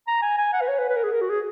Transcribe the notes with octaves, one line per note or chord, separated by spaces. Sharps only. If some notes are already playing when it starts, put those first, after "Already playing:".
A#5
G#5
G#5
F#5
B4
C#5
B4
B4
A#4
G#4
A#4
F#4
G#4